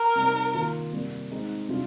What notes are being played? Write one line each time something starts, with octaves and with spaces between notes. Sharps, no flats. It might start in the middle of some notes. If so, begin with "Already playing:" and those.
Already playing: A#4
C3 G3 C4 D#4
D#3 A#3 F4
C3 G3 A#3
G#3 C4 D#4
C3 G3 D4 F4